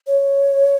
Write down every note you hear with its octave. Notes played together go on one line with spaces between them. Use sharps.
C#5